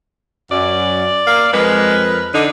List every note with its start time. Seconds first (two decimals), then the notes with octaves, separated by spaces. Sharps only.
0.51 F#2 D5
1.27 A#3 F5
1.53 F2 G#3 A#4 B4
2.34 D3 D4 D#4